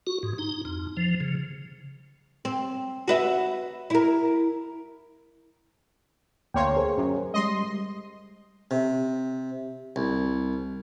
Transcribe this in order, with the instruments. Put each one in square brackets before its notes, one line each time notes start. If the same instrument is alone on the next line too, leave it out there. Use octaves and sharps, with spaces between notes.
[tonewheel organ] F#4
G#2
D#4
F2
F3
C#3
[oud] C4
F#4 B4 E5
E4 A#4
[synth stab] D2 A#3 C#5 [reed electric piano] G5 C6
[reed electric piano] G#4 A#4 C5
[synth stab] F#2
[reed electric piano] G3 G#3 [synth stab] D#5 C6
[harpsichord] C3
C2